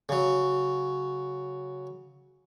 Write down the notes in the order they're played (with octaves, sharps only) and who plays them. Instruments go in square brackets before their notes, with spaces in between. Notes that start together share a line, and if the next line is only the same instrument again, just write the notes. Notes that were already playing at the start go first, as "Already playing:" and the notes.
[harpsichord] C#3 F#3